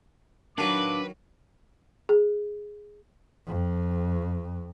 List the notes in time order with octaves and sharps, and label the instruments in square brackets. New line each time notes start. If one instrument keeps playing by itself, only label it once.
[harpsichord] D#3 F#3 [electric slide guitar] D4 F5 A5 [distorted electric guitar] B4 [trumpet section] D6
[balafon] G#4
[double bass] F2